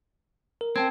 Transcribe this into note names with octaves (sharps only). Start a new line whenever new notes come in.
A#4
C4 G5 A5 G#6